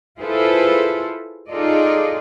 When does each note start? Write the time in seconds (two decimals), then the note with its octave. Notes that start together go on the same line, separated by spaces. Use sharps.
0.20 E4 F4 G#4 A4 B4 C5
1.49 D#4 F4 G#4 A4 D5 D#5